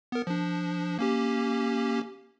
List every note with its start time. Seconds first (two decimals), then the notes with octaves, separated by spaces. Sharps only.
0.12 B3 A#4
0.27 F3 D4
0.99 A#3 C#4 G4